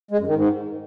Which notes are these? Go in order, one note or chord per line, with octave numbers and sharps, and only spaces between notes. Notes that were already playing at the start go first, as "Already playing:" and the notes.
G#3
F#2
D#3
G#2